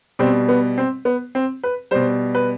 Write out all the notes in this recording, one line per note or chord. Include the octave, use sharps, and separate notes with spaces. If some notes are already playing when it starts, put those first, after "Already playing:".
B2 G3 C4
B3
C4
B3
C4
B4
B2 G3 C5
B4